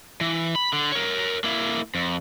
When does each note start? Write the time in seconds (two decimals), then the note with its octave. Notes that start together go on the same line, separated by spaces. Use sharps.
0.21 E3
0.56 B5
0.73 D3
0.92 A#4 C#5
1.44 A#3 E4
1.95 F2